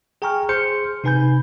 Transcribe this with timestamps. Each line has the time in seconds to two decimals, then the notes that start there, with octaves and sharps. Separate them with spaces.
0.22 G#4 G5 G#5 A#5 C#6 F6
0.49 G#4 C5 C6 F6 G6 C#7
1.04 C3 D#4 B4 G#5 B5 G6